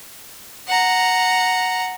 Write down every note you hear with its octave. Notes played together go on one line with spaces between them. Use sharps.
F#5 A#5